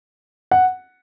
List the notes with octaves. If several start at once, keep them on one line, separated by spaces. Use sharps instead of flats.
F#5